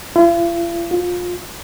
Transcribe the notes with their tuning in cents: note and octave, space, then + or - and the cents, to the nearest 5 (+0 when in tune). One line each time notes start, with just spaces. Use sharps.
F4 -45
F4 +25